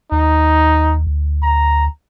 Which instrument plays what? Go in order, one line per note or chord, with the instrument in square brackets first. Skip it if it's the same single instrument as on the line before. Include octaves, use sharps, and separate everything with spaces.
[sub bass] D#2 [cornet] D#4
[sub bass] D2
[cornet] A#5